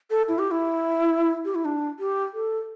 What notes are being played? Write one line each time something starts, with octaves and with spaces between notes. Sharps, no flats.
A4
E4
G4
E4
G4
E4
D4
G4
A4